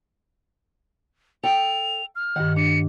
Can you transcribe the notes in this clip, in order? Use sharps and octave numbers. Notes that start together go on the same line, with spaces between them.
A4 G5 F7
F6
G2 D#3 F#5
D4 C#7